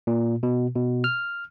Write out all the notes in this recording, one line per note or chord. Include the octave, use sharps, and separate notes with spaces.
A#2
B2
B2
F6